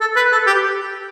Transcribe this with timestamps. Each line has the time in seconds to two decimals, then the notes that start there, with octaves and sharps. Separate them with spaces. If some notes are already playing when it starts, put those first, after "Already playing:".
0.01 A4
0.16 B4
0.32 A4
0.47 G4